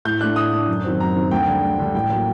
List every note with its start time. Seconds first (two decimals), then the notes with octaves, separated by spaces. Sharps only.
0.05 A2 G6
0.20 A3 D4 F#6
0.36 A2 D#6
0.52 A3 D4
0.68 F#2
0.84 D#3 F#3 C4
1.00 F#2 A#5
1.15 D#3 F#3 C4
1.31 D2 G5
1.47 D3 G3
1.63 D2
1.79 D3 G3
1.94 A1 G5
2.10 F#3 A#3